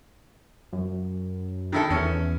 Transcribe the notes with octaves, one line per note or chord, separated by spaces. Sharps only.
F#2
D#3 E4 A4
E2 C#4